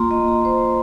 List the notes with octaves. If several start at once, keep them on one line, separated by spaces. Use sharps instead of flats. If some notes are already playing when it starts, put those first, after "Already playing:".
Already playing: A#3 F4 A#5 C6
D#5
A#5
C5